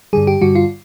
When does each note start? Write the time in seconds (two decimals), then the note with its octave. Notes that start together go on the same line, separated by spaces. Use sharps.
0.13 G2 D3 G3 G#4
0.27 G4
0.41 G2 D3 G3 F#4
0.55 F4